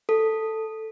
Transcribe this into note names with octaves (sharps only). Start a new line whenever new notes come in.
A4